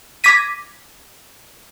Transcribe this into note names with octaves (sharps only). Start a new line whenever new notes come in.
D6 G#6 A#6 B6 D#7